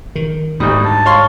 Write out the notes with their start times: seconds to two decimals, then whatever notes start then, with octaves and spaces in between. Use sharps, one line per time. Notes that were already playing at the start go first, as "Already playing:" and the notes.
0.15 D#3
0.60 D2 G#2 G3 D#4
0.85 A5
1.06 C#5 F5 C6